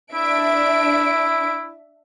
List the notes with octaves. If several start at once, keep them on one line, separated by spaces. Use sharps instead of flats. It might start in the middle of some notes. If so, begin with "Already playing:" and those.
D4 E4 E5 D7